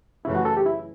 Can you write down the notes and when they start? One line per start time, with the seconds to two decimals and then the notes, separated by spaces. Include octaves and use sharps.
0.25 F#2 C#3 E3 A3 E4
0.35 F#4
0.45 A4
0.57 G4
0.66 E4